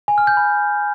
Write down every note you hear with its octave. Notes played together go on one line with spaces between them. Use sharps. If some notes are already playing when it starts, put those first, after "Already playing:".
G#5
F6
G6
B5